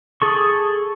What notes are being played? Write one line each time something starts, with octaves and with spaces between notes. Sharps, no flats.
G#4 A4 C#6